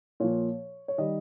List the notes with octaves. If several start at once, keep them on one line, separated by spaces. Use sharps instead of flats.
A#2 F3 C#5
C#5
D#3 G3 D#5